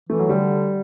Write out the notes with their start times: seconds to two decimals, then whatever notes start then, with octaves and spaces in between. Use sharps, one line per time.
0.09 E3 A3
0.19 F#3
0.29 D3 G3